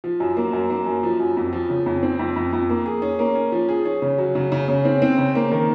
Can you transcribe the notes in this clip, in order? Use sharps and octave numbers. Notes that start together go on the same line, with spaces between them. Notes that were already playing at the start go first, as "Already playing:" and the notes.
F3
F#2
A#3
F#2
A#3
F#2
F3
F#2
F2
F3
C#3
F2
C4
F2
F2
F2
A#3
G#4
C#4
A#3
C#4
F3
G#4
C#4
C#3
F#3
C#3
C#3
C#3
C4
C4
C#3
A#3
D#3